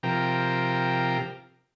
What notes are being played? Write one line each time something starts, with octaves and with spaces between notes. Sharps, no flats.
C3 F3 G4 A#4